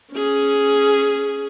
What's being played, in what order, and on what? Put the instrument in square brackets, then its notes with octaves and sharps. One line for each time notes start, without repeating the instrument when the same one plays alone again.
[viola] C#4 G#4